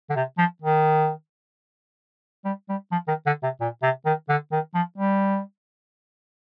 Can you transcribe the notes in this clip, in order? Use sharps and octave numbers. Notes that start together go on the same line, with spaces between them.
D3
C3
F3
D#3
G3
G3
F3
D#3
D3
C3
A#2
C3
D#3
D3
D#3
F3
G3